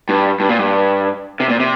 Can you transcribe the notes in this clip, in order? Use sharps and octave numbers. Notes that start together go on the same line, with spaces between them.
G2
G2
A#2
G2
C3
A#2
C3